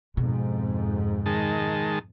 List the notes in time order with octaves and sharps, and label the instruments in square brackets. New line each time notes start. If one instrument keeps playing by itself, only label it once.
[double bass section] F2 G#2 [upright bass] B2
[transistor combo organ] D#3 G#3 A5